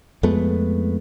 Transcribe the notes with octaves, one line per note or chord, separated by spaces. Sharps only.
F2 G#3 A3 B3